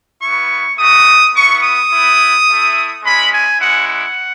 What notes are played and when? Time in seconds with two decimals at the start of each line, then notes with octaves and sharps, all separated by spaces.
0.20 B3 E4 C#6
0.77 A3 D#4 F#4 D#6
1.33 B3 E4 C#6
1.62 D#6
1.90 B3 E4
2.46 A3 E4
3.02 G#3 C#4 E4 B5
3.30 G#5
3.59 G#3 C#4 E4 F#5
3.87 F#5